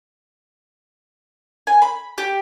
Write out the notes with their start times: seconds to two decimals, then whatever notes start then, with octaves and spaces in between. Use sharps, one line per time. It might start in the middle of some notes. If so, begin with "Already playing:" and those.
1.67 G#5
1.82 B5
2.18 G4